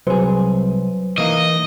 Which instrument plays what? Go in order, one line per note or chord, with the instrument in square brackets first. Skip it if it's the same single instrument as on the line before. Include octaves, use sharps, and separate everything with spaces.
[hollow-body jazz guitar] C2 G#4 [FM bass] F#3 [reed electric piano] B4 C5
[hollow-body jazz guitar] E3 A#3 D#4 [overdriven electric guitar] D#5